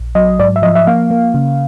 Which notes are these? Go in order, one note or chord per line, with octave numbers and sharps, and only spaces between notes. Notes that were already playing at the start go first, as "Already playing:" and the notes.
Already playing: A#1
F#3 D#5
G#2 D5
E5
F3 D#5
E5
A#3 F5
A#3
C#3